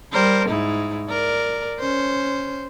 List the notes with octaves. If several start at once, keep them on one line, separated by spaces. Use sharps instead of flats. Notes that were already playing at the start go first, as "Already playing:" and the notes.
G3 A#4 C5
G#2 D#4 E4
A#4 D5
C#4 C5